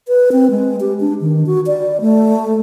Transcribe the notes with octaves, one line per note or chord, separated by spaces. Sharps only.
B4
C4
G#3
G4
D4
D#3
F#4
D5
A3